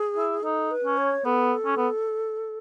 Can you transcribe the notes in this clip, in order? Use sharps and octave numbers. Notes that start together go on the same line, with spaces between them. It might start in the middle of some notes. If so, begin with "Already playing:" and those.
Already playing: G#4
E4
D#4 A4
B4
C#4
C#5
B3 A4
C#4
B3